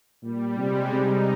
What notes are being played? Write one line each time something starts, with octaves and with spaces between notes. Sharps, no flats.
A#2 G3
C3 G#3
C3 D#4